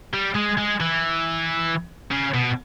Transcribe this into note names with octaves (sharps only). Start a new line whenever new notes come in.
G3
G#3
G#3
E3
C#3
B2